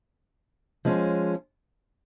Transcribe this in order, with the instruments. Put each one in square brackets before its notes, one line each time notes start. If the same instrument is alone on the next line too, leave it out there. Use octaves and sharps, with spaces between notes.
[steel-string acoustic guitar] F3 G#3 C#4